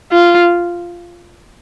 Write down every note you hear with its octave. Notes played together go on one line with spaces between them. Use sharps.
F4